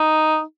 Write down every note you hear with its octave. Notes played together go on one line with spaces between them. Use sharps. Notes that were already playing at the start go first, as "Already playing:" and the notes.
Already playing: D#4